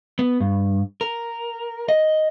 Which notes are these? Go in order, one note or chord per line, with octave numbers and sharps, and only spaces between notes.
B3
G2
A#4
D#5